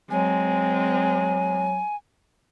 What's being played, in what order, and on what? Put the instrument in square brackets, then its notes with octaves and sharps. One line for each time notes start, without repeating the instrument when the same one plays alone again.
[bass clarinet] F#3 [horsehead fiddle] G#3 C4 [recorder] G#5